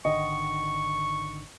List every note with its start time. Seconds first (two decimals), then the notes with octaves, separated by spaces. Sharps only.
0.05 G#1 D3 D#3 D#5 C#6